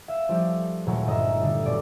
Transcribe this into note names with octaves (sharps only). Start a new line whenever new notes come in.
E5 F5
F3 G3 A3 C#4 E4 G4
D#1 A#2 F#3 G#3 A3 F#5
G1 D#5 E5
D3 G3 E4
D#1 B1 D5